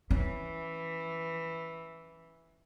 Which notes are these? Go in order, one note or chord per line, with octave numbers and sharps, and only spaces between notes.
E3 C#4